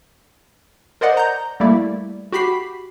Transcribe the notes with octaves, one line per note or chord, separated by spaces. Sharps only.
A#4 C5 D5 D#5 F#5
A#5 G6
G3 A3 A#3 E4 D5
F#4 G4 B5 B6 C7